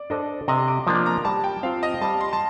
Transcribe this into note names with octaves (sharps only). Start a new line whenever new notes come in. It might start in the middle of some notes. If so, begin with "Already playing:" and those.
Already playing: D5
D4 A4 C5 D#5
C3 D#5
D6
F3 A#3 D4 A#5
A#5
G3 A5
G5
C4 F4 F5
D#5
G3 A5
C6
A5